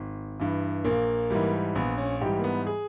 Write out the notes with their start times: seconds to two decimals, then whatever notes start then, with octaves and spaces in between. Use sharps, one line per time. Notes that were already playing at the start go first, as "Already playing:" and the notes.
Already playing: G#1
0.40 G2 E3
0.85 A#1 A#3
1.30 G#2 E3 G3
1.75 A#1 B3
1.98 C#4
2.21 G#2 E3 G3 G4
2.39 A#3
2.44 B3
2.67 G#4